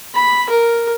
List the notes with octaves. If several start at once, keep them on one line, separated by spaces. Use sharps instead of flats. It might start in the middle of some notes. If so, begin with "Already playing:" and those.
B5
A#4